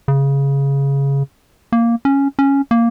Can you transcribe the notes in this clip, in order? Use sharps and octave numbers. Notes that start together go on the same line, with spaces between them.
C#3
A#3
C#4
C#4
A#3